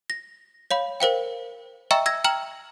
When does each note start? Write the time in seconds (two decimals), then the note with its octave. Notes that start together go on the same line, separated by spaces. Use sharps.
0.10 A#6
0.71 C#5 F5 B5
1.00 A#4 C5 F5 G5
1.91 D#5 E5 G5 A#5 C#6 E6
2.06 E6 G#6 A#6
2.24 G5 A#5 F6 F#7